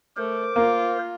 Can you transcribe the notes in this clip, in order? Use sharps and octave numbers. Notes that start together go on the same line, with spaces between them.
A3 A#4 C5 D6
A#3 F4